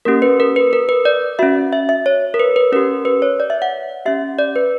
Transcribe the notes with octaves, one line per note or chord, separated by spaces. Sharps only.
A#3 C#4 G4 A#4
B4
A#4
B4
A#4
B4
D5
C#4 F#4 E5
E5
E5
C#5
A#4
B4
B4
C#4 G4 A#4
B4
C#5
D5
E5
F#5
C#4 G4 E5
D5
B4